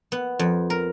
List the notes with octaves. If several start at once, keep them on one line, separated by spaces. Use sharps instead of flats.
B3
F2
A#4